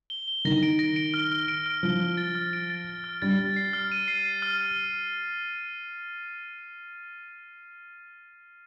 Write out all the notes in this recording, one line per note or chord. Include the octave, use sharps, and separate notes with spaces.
G7
G7
D#3 A#6
D7
A#6
D7
F6
F6
D7
F6
F3 F6
F6
A6
F6
D7
A6
A6
F6
G3 A6
A6
C7
F6
D#7
C7
C7
F6